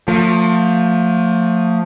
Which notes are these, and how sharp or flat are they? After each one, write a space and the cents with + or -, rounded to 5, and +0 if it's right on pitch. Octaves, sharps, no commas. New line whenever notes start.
F3 +30 A3 +40